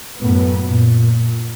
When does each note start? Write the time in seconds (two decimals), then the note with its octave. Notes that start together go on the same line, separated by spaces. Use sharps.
0.19 F#2 A2 B3
0.67 A#2